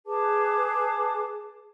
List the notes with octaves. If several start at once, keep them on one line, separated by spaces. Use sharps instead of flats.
G#4 B4 A5 D6